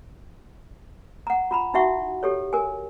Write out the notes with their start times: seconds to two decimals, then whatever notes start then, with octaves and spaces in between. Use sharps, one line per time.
1.27 F#5 A#5
1.51 F4 A#5 B5
1.74 D#4 E4 F#4 E5 F#5 C#6
2.23 G4 A4 C#5
2.53 A#4 G#5